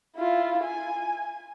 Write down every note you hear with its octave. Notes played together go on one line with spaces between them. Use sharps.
E4 F4
G#5